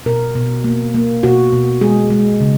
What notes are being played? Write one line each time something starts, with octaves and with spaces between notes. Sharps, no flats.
B2 A#4
B2
A#3
A#3
B2 F#4
B2
G#3 G#4
G#3
C#3